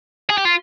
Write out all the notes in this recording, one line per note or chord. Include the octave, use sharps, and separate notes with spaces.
G#4
G4
F4